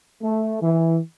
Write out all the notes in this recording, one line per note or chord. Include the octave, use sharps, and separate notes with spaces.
A3
E3